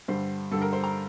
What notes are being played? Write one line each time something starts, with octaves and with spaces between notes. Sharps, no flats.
G2 D3 G3 C5
G2 D3 G3 A4
A#4
C5
A#5